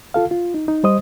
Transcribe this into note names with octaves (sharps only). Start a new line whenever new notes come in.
F4 A4 F5
F4
D#4
D#4
G3 C5 D#5 D#6